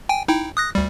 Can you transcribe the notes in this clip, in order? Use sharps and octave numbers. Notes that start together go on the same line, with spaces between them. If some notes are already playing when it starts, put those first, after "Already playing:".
G5 G#5
D#4 E4 G5
D#6 F#6 A#6
D2 G3